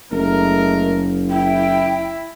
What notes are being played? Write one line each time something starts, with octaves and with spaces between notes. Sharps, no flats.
F#1 G#3 A3 A#4
E4 G5